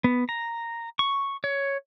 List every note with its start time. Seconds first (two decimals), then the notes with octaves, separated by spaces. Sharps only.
0.04 B3
0.29 A#5
0.99 C#6
1.44 C#5